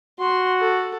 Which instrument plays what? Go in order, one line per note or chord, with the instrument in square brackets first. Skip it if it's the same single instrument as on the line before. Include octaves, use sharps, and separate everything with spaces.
[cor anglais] F#4 [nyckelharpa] C6
[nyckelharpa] A4